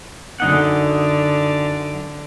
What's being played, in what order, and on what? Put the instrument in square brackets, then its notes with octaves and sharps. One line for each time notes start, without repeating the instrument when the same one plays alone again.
[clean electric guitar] F#2 D#4 F#5 [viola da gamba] D3